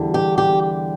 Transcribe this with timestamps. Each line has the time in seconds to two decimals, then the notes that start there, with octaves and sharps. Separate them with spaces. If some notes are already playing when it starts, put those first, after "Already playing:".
Already playing: E2 D3 G3
0.14 G4
0.38 G4